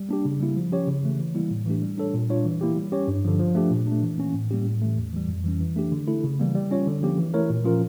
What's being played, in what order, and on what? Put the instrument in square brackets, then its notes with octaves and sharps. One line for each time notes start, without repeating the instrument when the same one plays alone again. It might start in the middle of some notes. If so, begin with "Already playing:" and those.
Already playing: [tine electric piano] G3
A#3 D4 G4
C#3
G3 A#3 E4
F3
C#4 G4 C#5
C#3
E3 A3
E3
G3 A#3 E4
A2
E3 A3 D4 G4
G3
D4 A4 C#5
A#2
G3 D4 F4 C#5
E3
A#3 E4 G4
G3
C#4 G4 C#5
G2
D3 F3
F3
A3 D4 G4
A#2
A3 D4
E3
A#3 C#4
A2
G3 A#3 C#4 G4
A2
E3 A3
E2
E3 G3
F2
E3 G3 C#4
E3
A3 D4 G4
D3
A3 E4 A4
C#3
E3 G3 A#3
G3
C#4 F4 C#5
D3
F3 A#3 C#4 G4
E3
A3 E4 A#4 C#5
A#2
F3 C#4 F4 A#4